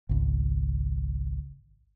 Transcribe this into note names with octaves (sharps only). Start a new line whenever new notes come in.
G#1 C#2